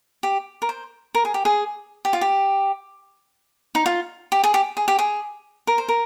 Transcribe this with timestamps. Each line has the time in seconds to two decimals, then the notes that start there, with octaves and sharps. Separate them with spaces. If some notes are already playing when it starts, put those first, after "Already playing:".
0.23 G4
0.62 A#4
0.69 C5
1.15 A#4
1.25 G#4
1.34 G4
1.45 G#4
2.05 G4
2.13 F4
2.21 G4
3.75 D#4
3.86 F4
4.32 G4
4.44 G#4
4.54 G4
4.77 G#4
4.88 G4
4.99 G#4
5.67 A#4
5.78 C5
5.89 A#4